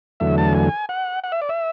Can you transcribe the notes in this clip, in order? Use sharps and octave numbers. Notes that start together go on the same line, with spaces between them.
E2 D3 F#3 A3 E5
A5
G#5
F#5
F#5
E5
D5
E5